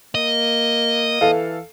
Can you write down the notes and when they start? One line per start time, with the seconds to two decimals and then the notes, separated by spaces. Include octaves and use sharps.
0.15 A#3 D#5
1.21 E3 A4 F5